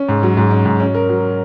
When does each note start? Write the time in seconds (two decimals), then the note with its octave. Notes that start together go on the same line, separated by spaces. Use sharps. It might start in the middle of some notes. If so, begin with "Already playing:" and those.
Already playing: C#4
0.09 G#2
0.23 F#3
0.37 G#2
0.51 C#4
0.66 G#2
0.80 C#4
0.95 A#4
1.09 F#3